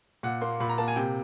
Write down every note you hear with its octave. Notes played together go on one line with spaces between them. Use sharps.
A#2 F#5
A#3 C6
A#2 B5
A#5
A#3 A5
G#5
C3 G5